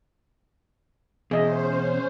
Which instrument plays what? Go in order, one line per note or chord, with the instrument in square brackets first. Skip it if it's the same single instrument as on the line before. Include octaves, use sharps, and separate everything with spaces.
[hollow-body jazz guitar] E2 [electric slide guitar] B2 [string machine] C#4 C5 [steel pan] G#4 D#5 E5